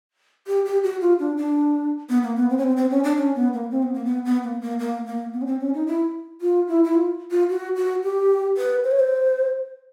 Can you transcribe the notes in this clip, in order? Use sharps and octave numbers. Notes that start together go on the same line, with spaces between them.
G4
G4
F#4
F4
D4
D4
B3
A#3
B3
C4
C#4
C4
C4
C#4
D4
C#4
B3
A#3
C4
B3
A#3
B3
B3
A#3
A#3
A#3
A#3
B3
C#4
C4
C#4
D#4
E4
F4
E4
E4
F4
F4
F#4
F#4
G4
B4
C5
C#5
C5